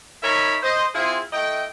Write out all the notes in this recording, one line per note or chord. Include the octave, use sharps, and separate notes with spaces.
D#4 A#4 C#5 E5 G#5 B5
C5 D#5
C4 E4 F4 G#4
A3 E4 D#5 G5